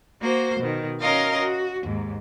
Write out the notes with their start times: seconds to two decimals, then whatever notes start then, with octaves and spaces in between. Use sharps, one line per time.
0.22 A#3 F#4 C5
0.60 B2 D#3
1.01 C#4 F#4 A#4 D#5 F5 C6
1.38 F#4
1.83 D#2 G#2